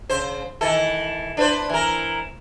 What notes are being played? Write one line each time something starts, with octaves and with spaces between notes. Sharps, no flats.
C#3 C5
D#3 E3 A4
D4 B4 C5
E3 A#4